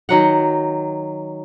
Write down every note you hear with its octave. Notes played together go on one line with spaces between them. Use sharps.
D#3 F#3 F#5